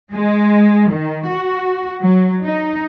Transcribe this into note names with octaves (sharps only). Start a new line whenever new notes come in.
G#3
D#3
F#4
F#3
D#4